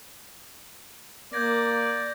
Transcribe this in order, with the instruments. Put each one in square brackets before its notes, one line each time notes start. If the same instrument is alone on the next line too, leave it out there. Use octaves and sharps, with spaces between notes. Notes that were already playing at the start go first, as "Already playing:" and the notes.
[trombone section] A#3 [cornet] D5 [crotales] G6 G#6 A#6